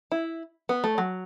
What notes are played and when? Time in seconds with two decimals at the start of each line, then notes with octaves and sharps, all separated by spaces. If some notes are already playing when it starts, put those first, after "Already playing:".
0.12 E4
0.69 B3
0.84 A3
0.98 F#3